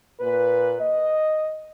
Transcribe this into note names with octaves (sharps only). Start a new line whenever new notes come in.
A#2 B4
D#5